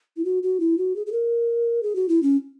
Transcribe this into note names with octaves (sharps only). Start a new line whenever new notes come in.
E4
F#4
F#4
E4
F#4
G#4
G#4
A#4
G#4
F#4
E4
C#4